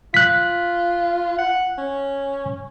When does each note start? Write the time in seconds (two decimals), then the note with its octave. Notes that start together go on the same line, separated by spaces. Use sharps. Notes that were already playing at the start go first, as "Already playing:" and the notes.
0.14 F4 F#6 B6
1.38 F#5
1.78 C#4